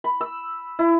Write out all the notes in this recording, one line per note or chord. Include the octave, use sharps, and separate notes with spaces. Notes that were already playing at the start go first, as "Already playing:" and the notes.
B5
E6
E4